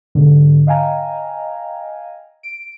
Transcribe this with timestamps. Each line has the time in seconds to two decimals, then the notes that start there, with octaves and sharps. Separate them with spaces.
0.15 G#2 B2 D3
0.67 D#5 F5 G5 G#5 A#5
2.43 D7